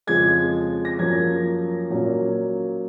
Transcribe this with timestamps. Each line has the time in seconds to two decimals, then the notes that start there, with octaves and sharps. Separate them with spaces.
0.07 F2 C#3 F3 G#3 G#6
0.85 A#6
0.99 F#2 F3 A#3 C#4 G#6
1.90 A#2 F#3 A#3 C#4